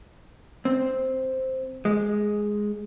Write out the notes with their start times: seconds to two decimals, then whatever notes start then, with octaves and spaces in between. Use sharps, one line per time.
0.65 C4
1.85 G#3